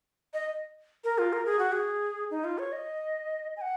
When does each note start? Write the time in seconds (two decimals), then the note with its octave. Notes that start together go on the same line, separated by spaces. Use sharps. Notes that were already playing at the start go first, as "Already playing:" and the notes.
0.34 D#5
1.04 A#4
1.18 F4
1.33 A#4
1.46 G#4
1.59 F#4
1.72 G#4
2.31 D#4
2.44 F4
2.58 C#5
2.72 D#5
3.57 G#5
3.61 F#5